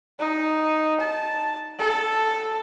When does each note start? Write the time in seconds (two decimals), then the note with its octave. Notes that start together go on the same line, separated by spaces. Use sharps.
0.19 D#4
1.01 A5
1.79 A4